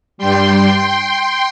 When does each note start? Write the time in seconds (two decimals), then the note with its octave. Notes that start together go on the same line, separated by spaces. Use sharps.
0.18 G2 G3 G5 C6